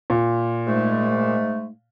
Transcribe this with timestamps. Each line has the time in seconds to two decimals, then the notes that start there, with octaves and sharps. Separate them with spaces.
0.10 A#2
0.66 G#2 G#3 A3